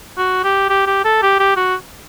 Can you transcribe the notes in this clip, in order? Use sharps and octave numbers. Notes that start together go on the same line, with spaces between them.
F#4
G4
G4
G4
A4
G4
G4
F#4